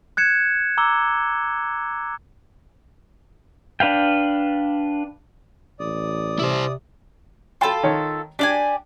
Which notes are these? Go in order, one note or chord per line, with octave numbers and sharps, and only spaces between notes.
F#6 G#6 C#7 E7
A#5 D6 E6 G7
D4 B4 F5 G5
A1 D5 D#6
C3 E4 C5
F4 A4 G5 A5 B5
D#3 C#5
D4 G4 D5 G#5